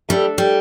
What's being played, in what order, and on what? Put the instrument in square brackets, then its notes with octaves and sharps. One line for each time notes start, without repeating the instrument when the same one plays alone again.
[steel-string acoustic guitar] G3 [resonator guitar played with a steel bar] A3 D4 A4
[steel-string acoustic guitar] G3